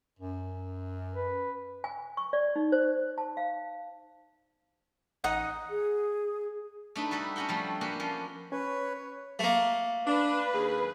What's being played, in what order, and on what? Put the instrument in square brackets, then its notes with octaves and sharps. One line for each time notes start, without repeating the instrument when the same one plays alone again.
[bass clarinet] F#2
[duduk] B4
[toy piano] G#5
C#6
D5
D#4
C5
A5
F5
[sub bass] A1 [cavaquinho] D#4 D#5 F#5
[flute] G#4
[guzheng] A3 D4 D#4 B4
G3 F#4 A4 B4
C#4 D4 F#4 F#5 G5
F3 G3 A3
A#3 B3 C#4 D4 F#4 G4
F3 C#4
[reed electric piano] C#4 [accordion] B4 [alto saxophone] C#5
[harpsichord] A3 A#3
[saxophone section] D4 [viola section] B4
[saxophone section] D#2 G#4